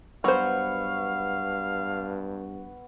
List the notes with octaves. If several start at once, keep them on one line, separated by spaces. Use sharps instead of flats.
G2 F#3 B3 C5 F5 C#6